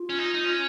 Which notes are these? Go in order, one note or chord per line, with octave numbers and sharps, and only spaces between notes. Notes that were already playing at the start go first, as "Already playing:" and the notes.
Already playing: F4
C#4
D#4
D#4
C#4